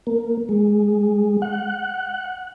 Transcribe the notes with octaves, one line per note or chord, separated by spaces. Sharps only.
A#3
G#3
F#5